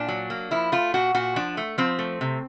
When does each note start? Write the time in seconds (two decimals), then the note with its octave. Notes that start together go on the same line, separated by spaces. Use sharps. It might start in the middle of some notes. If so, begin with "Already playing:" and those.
Already playing: A#2 D4
0.08 F#3
0.30 A#3
0.51 F3 E4
0.72 A3 F4
0.94 A#2 F#4
1.14 A#2 F#4
1.36 F3 D4
1.57 A3
1.78 F3 C4
1.99 A3
2.21 C3